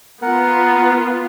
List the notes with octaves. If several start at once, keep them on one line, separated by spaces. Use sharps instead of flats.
B3 F4 A#4 F#5